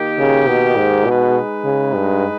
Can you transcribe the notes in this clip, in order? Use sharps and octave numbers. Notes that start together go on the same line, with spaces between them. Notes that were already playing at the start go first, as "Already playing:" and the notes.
Already playing: D#3 A#3 D#4 G4
C#3
B2
G#2
B2 G#3 D#4 G#4 B4
C#3
G2